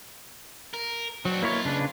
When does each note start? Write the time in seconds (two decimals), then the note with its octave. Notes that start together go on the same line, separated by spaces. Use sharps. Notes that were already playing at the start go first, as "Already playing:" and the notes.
0.74 A#4
1.25 F#3 C4 D4
1.42 B1 A#3 E4 F4 C#5
1.65 C#3 D4 B4